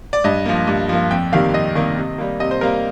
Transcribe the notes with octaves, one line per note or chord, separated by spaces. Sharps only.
D5
G2 D#5
F3 A#3
G2
F3 A#3
F2 G5
C3 D#3 G3 A#3 F5
F2 D#5
C3 D#3 G3 A#3
C3
G3 A#3
C3 D#5
C5
G3 A#3 A#4